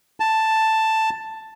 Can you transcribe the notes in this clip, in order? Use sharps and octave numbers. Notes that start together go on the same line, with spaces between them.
A5